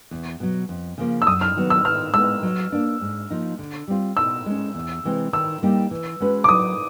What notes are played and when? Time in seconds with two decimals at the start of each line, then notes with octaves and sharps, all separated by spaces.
0.11 E2
0.40 B2 F#3
0.69 F2
0.98 C#3 F3 A#3
1.22 E6
1.27 F#2 D#6
1.41 F6
1.57 D#3 F#3 B3
1.70 E6
1.85 D#3 F6
2.14 G#3 B3 E6
2.43 F#3
2.72 A#3 D4
3.01 G#2
3.30 F3 A#3 D#4
3.59 D3
3.88 G3 C4 F4
4.17 B2 E6
4.46 G#3 C#4
4.75 E2
5.04 C3 E3 G#3 C4
5.33 D#3 E6
5.63 G3 A#3 D#4 G4
5.91 E3
6.20 G#3 C#4 F#4 B4
6.44 D6
6.49 F#3 D#6